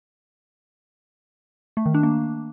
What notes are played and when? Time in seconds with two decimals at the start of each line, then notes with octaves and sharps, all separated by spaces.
1.77 A3
1.86 D#3
1.94 D4
2.03 A#3